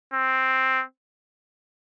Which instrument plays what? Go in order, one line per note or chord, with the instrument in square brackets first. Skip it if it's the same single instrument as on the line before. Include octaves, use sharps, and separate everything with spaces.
[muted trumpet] C4